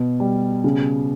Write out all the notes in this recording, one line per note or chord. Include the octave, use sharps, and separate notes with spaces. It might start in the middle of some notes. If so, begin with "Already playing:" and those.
Already playing: B2
G3
C#3